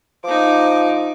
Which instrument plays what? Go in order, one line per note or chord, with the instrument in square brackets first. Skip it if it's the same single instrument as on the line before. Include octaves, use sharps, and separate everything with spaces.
[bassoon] F3 [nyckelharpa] D#4 D6